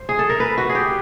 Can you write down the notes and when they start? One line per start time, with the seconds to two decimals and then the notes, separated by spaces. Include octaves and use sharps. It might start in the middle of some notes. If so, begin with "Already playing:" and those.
Already playing: C5
0.09 G#4
0.19 A4
0.30 A#4
0.40 B4
0.58 F#4
0.69 G#4
0.75 G4